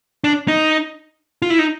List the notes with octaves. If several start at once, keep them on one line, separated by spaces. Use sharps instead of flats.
D4
D#4
F4
E4
D#4